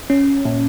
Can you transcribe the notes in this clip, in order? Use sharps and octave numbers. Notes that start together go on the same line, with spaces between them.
C#4
A#2